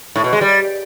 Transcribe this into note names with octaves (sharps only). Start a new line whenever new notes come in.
A2
B2
G#3
G3